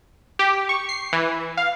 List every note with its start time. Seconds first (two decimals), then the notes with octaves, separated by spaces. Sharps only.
0.39 G4
0.69 C#6
0.89 C7
1.13 E3
1.57 F5